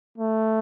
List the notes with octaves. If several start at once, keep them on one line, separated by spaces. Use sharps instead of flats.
A3